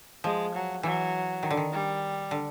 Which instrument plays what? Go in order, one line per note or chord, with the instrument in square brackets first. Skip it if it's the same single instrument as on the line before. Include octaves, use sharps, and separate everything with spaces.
[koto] F3 [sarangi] G#3
[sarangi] F#3
[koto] E3 [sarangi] F#3
[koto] D#3
D3
D#3
[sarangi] G3
[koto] D3